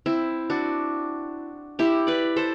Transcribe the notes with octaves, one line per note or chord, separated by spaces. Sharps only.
C4 E4
D4 F#4
E4 G4
B4 D5
A4 C5